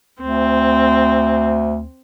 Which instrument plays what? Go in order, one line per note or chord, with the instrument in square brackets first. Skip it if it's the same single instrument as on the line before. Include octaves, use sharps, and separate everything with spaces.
[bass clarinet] D2 [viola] C4